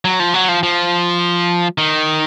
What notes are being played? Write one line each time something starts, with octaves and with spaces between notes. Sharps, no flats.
F#3
F3
F#3
F3
F3
D#3